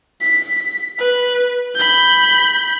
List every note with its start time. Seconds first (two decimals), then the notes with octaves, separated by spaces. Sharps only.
0.21 B6
0.99 B4
1.76 B5 G6